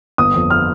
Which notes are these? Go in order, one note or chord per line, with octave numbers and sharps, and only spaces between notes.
G1 D#6
F2
F6